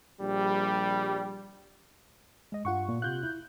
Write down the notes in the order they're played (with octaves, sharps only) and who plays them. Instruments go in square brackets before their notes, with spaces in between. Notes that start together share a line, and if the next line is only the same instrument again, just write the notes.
[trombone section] A#1 G3
[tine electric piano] G#3 D#5
[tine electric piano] G2 [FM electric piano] F4 F#5 C#6
[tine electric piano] A#2
[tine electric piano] C3 F4 F5 [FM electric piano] F#6 G6
[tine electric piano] E4